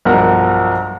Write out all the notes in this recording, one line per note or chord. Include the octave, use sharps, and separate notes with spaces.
B1 G2 F3 A#4 F#5 A#5